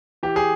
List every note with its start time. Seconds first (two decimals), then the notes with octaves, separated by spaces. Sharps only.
0.23 E3 G4
0.36 G#4